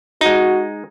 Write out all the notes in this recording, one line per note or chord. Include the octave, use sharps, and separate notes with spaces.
G#3 D#4 F#4